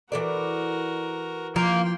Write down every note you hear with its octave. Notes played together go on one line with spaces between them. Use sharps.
E3 F#4 A4 A#4 D5
F3 A#3 G5 C6